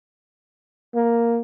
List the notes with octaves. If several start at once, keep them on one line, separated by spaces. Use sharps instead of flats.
A#3